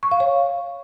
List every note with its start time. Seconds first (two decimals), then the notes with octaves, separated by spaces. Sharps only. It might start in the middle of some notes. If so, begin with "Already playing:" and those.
0.03 C#6
0.12 F5
0.20 C#5